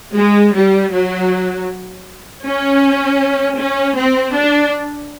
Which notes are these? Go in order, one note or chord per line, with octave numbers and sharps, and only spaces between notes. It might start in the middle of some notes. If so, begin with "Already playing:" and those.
G#3
G3
F#3
C#4
C#4
C4
D4